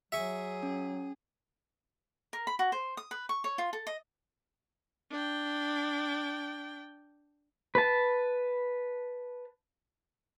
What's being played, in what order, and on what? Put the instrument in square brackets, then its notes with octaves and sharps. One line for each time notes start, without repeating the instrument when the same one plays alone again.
[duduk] F#3 [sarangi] G#4 [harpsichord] E5 C#6
[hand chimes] C#4
[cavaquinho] A#4
B5
F#4
C5
D#6
B4
C#6
C#5
F4
A4
D#5
[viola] D4 G5
[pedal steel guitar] B4 A5